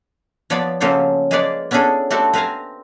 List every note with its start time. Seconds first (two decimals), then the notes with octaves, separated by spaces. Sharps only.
0.50 F3 B3 C#5 D5 E5 B5
0.80 C#3 F3 F#3 A#3 A4 C5
1.31 G#3 A#3 G#4 B4 C#5 D5
1.71 B3 C#4 D4 E4 G#4 A4
2.10 A3 C4 F#4 G4 A4
2.33 C4 B4 F5 G#5 A#5